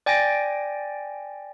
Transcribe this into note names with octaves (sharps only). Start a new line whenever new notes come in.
D5 G5 G#5 A6 A#6 D7